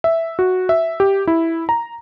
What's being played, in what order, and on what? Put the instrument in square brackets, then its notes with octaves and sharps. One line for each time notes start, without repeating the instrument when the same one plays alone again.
[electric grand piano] E5
F#4
E5
G4
E4
A#5